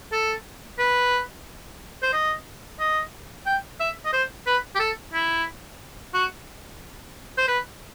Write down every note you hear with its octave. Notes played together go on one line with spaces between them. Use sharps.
A4
B4
C5
D#5
D#5
G5
E5
D#5
C5
B4
G4
A4
E4
F#4
C5
B4